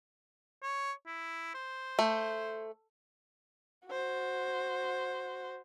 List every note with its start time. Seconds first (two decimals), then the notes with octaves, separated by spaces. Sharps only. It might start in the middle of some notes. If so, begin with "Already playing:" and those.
0.63 C#5
1.07 E4
1.55 C5
1.99 A3
3.87 F#4 C5